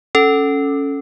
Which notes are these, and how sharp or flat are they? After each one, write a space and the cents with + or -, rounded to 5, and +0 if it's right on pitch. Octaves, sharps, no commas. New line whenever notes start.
C#4 +0 A4 +0